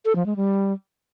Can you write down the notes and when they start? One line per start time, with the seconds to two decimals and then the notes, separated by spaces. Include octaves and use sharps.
0.05 A4
0.16 F3
0.26 G#3
0.36 G3